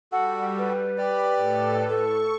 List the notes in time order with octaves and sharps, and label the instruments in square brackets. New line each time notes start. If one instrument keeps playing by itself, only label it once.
[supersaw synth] G3 [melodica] F#4 A4 [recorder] F#5
[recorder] B4
[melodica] G4 D5 [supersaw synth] B5
[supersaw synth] A2 A4
[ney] A4 [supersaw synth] C#6